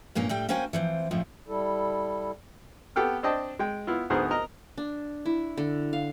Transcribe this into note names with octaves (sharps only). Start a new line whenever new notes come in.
G2 A#2 A#3 C#4
A2 G3 G5
A#3 C#4 F#4 C5 G5 G#5
E3 F3 C4
F2 A2 C#3 F3
G3 E4 A4
B3 G4 A4 G5 F6
C4 D4 D#5 G5 A5
G#3 G5
B3 E4 F4
D2 G#2 B3 G#4 A#4 C5
A#4 D#5 A#5
D4
E4
D3
F5